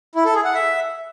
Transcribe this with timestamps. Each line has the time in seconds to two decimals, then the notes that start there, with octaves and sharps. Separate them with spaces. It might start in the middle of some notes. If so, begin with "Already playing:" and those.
0.15 E4
0.25 A4
0.35 G#4
0.45 F#5
0.54 E5